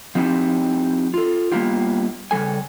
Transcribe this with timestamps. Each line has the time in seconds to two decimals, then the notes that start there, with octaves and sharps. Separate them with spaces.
0.15 F3 C4 D#4 E4 G4
1.14 F4 A4
1.52 G3 A#3 B3 E4 F4 G4
2.31 C#3 G3 A4 G#5